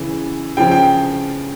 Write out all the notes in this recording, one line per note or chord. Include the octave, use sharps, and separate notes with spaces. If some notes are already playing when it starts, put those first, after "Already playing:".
Already playing: C#3 E3
C#3 F3 G5
G5